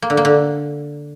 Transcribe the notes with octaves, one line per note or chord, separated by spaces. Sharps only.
A#3
D3
A#3
D3